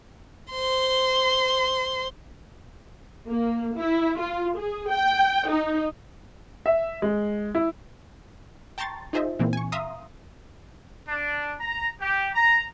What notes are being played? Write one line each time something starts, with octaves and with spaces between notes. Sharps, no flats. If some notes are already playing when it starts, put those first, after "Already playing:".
C5 C6
A#3
E4
F4
G#4
G5
D#4
E5
G#3
E4
G5 A5 A#5 C6 C#6 A6
D#4 F4 G#4 C5 D#5 E5
A#2 E3 A#3 C4
G#5 C#6
E5 F5 A#5 C6 D#6
D4
A#5
G4
A#5